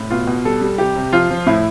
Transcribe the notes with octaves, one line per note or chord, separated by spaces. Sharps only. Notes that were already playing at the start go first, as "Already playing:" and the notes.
Already playing: A2
B2 F4
B2
G3 A4
G3
C3 G4
C3
F3 F4
F3
A2 E4